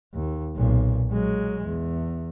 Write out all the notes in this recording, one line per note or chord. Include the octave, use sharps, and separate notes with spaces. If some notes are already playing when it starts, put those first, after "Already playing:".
D#2
B1 A#2
F#3 G#3
E2